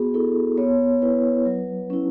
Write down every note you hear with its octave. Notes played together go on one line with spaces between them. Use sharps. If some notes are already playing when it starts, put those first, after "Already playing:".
Already playing: B3 F#4 G#4
E4 A4
B3 C#5
E4 B4
F#3
C#4 E4